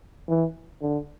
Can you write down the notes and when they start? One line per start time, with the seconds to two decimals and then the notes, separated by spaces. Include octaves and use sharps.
0.29 E3
0.82 D3